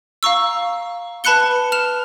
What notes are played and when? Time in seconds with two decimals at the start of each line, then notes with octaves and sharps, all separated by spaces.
0.23 F5 A#5 C#6 E6
1.24 B4 A5 B5 F#6 C#7 G7
1.72 F6 E7 F7